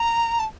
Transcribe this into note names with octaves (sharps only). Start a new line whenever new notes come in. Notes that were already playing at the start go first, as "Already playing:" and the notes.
Already playing: A#5
A5